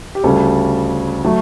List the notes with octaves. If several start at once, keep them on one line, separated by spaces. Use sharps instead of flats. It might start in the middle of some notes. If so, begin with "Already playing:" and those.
G4
D2 C#3 G3 A4
F#3 A3